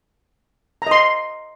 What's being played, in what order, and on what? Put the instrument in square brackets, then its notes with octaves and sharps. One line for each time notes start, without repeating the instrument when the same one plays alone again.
[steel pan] A#5
D#5
C6